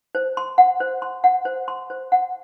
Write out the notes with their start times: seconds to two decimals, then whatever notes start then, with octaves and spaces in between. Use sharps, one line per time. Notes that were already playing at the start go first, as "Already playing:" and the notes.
0.15 C5
0.37 C6
0.58 F#5
0.80 C5
1.02 C6
1.24 F#5
1.45 C5
1.68 C6
1.90 C5
2.12 F#5